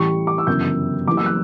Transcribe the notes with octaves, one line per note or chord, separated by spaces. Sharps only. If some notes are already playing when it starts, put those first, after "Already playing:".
Already playing: A1 A2 G3 C#6
D6
E6
G1 F#2 C#3 E3 G3 G6
F#1 F#2 E3 G3 D6
E6
F#6